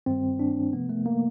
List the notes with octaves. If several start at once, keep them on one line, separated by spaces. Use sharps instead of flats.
G2 D#3 G3 C4
D4
C3 F3 A3 B3
A3
A#3